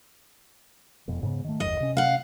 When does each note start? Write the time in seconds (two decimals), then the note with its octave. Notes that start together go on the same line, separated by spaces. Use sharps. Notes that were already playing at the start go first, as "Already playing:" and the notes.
1.08 E1 F2 B2
1.23 G#2 C#3 B3
1.44 D#3 A3
1.60 F#1 D#2 D#5
1.80 C3 C#4
1.97 F5 F#5